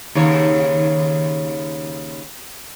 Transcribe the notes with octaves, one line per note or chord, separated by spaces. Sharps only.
D#2 C#3 C#5